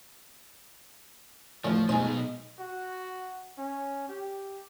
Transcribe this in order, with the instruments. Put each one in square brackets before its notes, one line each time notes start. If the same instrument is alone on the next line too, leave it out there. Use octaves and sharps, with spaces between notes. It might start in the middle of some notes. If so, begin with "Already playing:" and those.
[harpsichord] D2 A2 [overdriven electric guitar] F3
[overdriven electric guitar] B2 D#4 [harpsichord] G#3 C5
[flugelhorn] F#4
C#4
G4